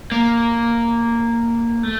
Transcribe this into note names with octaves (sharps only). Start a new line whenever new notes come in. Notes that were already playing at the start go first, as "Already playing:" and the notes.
A#3
A3